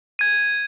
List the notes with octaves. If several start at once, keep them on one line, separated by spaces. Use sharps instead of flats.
G#6 D#7